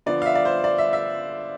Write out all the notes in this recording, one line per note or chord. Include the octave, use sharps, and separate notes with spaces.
D3 F3 B3 D5
F5
E5
D5
C5
D5
E5
E5